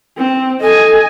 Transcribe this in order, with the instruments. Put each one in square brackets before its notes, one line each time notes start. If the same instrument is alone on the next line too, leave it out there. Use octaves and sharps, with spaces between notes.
[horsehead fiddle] C4
[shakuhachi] A4 [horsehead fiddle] D#5 G#5